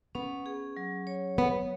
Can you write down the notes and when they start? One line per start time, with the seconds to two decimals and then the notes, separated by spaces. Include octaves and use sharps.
0.15 B3 C#4
0.46 G#4
0.77 F#3
1.07 C#5
1.38 B3 B4